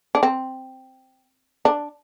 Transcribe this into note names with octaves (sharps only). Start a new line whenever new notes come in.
D4
C4
D4